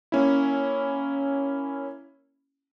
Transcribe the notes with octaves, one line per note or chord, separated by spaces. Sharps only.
A#3 C#4 E4